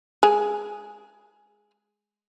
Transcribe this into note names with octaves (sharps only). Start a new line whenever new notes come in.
G#3 G#4